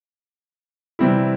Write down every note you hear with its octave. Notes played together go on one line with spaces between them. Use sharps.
C3 E3 G3 C4 E4